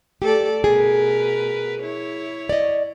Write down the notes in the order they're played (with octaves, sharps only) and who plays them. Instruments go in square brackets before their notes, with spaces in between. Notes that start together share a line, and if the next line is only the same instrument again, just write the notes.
[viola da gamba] A3 A4 D5 [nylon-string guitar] G4
[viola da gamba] B2 A#4 B4 [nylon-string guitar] G#4
[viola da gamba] E4 C#5
[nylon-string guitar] D5 D#5